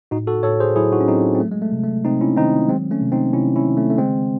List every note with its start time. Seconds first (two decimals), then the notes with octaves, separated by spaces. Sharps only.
0.11 A2 D#4 F#4
0.27 F#4 A4
0.43 A2 A4 C#5
0.60 G#4 C5
0.76 F#3 E4 G#4
0.92 D#4 F#4
1.00 C#4
1.08 F#3 C4 D#4
1.35 C4
1.40 F#3 A3
1.51 G#3
1.62 A3
1.72 C3
1.84 A3
2.05 C3 C4 D#4
2.21 C#4 E4
2.37 D#3 C4 D#4
2.69 F#3 G#3 C4
2.91 A3 C#4
3.01 C3
3.12 C4 D#4
3.33 C3 C#4 E4
3.56 C#4 E4
3.66 D#3
3.77 A3 C#4
3.90 A3
3.98 C#3 G#3 C4